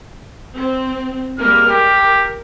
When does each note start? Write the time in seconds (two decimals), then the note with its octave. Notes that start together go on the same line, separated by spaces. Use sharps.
0.55 C4
1.39 G3 G#3 A#3 F6
1.69 G4 A#4